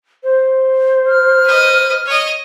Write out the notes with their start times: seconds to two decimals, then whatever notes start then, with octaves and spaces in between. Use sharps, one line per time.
0.23 C5
1.07 F6
1.45 B4 D#5
2.06 C#5 D#5